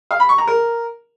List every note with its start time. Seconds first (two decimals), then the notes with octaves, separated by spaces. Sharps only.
0.11 F5
0.20 B5
0.29 C#6
0.38 A#5
0.47 A#4